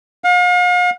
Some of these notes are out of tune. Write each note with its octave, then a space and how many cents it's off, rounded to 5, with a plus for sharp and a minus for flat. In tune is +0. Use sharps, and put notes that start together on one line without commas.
F5 +40